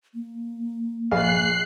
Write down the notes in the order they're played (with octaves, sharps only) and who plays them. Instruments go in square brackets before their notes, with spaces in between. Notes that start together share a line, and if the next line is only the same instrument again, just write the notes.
[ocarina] A#3
[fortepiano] A#1 G#4 F5 [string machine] F#6 C7